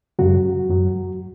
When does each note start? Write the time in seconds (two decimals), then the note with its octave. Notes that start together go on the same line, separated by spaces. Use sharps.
0.19 F#2 C#3 F#3 F#4
0.70 F#2 F#3